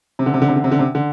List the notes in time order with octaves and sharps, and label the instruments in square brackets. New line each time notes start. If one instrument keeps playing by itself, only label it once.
[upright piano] C3
D3
C3
D3
C3
D3
C3
D3
C3
D3